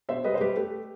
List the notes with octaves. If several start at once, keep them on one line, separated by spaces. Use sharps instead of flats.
B2 C5 E5
G3 B4 D#5
C5
G3 G4 B4
A3 G4